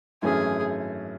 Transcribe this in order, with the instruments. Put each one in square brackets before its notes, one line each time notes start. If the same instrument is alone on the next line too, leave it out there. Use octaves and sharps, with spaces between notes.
[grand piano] G#1 F#2 E3 A3 C#4 [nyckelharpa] G#4